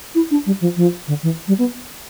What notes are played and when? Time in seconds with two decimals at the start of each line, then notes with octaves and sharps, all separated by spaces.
0.15 E4
0.31 D4
0.46 G3
0.61 F3
0.76 F3
1.08 D3
1.23 E3
1.48 G3
1.58 B3